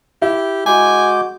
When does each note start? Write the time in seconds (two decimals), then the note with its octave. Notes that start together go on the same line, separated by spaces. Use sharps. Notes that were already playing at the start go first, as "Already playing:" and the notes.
0.22 E4 G4
0.66 G#3 F#4 G#5 D6 G6